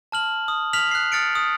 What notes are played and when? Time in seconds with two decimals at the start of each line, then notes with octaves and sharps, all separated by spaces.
0.12 A5 F6 F#7
0.48 D#6
0.73 F6 B6 F7 F#7
0.91 F#6 B6 C7
1.12 D#6 F6 A6 C#7 D7
1.35 D#6